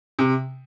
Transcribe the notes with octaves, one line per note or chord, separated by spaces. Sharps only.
C3